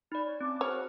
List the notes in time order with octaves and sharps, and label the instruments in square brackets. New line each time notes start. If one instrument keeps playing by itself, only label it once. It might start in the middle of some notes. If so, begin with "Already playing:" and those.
[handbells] D#4 D5 [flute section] B5
[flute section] C#5
[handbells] C4 [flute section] C#4 A5 D6
[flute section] F#4 G#4 F6 [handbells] C5 [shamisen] C#5